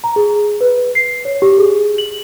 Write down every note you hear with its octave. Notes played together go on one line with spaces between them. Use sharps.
A#5
G#4
B4
C7
C#5
G4
G#4
F#7